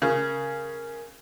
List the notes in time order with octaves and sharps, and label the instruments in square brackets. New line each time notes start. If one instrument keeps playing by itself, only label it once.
[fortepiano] C#3 [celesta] A#4